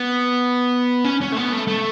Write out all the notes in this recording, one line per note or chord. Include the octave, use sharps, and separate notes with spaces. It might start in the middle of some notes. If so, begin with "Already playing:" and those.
Already playing: B3
C#4
C#4
A3
B3
A3
A3